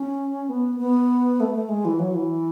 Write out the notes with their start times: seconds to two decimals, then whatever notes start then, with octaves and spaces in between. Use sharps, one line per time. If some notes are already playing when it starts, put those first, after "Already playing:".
Already playing: C#4
0.49 B3
0.80 B3
1.40 A3
1.55 A3
1.69 G#3
1.85 E3
1.99 F#3
2.14 E3